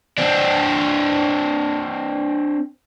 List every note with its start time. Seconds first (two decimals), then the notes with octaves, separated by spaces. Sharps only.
0.18 C4 D4